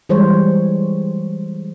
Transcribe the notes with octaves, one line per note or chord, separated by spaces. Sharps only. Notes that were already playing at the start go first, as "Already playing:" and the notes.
E3 G3 G#3 C5 C#5